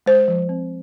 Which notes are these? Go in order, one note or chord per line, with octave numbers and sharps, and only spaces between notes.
G#3 C5
F3
C4